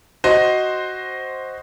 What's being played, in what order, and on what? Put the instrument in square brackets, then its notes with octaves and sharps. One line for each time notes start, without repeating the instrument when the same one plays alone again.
[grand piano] F#4 C5 D#5